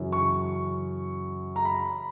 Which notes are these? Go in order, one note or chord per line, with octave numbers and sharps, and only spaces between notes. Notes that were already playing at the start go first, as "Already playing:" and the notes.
Already playing: F#2 C#3 E3
C#6
A#5
B5